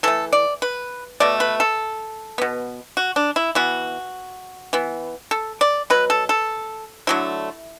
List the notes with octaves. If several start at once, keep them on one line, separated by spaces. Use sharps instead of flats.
E3 A3 A4
D5
B4
B2 A3 D5
B4
A4
B2 B3
F#4
D4
E4
E3 B3 F#4
E3 B3
A4
D5
B2 F#3 B4
A4
A4
D3 F#3 A3 E4